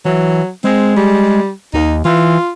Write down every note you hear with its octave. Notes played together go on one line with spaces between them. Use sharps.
E3 F#3
G#3 C4
G3
D#2 D#4
E3 F4